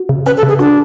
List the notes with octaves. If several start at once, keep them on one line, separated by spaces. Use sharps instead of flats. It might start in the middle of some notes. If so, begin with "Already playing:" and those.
Already playing: F#4
C#3
C#4 B4
A4
C#3
G#4
D4 F#4